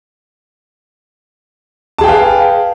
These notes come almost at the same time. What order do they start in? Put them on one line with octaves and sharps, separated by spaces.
A5 G#4 G5 B4 F5